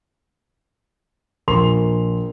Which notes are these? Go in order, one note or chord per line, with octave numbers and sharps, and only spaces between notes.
A#1 A#4 C6 F7